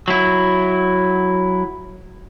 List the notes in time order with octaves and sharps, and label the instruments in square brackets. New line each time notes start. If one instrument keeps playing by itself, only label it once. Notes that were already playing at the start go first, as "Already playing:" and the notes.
[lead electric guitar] F#3 E4